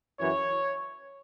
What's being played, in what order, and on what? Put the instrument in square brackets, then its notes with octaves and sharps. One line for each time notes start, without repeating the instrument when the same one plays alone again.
[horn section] F#2 E3 C#5